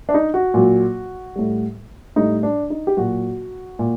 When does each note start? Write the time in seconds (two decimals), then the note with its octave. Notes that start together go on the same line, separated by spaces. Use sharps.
0.09 D4
0.14 D#4
0.34 F#4
0.54 A#2 F#3
1.36 A2 G3
2.16 A2 G3 D#4
2.43 D4
2.70 D#4
2.87 G4
2.97 A#2 F#3 F#4
3.79 A#2